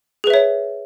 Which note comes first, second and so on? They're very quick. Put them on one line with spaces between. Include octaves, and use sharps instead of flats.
G#4 B4 E5 C#5